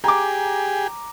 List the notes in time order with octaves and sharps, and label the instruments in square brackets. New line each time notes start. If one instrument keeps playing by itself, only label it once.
[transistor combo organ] G4 G#4 [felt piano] A#5 D6